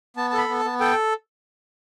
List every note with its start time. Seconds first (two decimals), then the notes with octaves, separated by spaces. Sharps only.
0.16 B3 A5
0.30 A5
0.33 A4 B5
0.49 B3
0.59 A5
0.65 B3
0.80 A4 G5